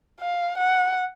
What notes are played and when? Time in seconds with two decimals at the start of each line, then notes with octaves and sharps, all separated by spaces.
0.20 F5
0.57 F#5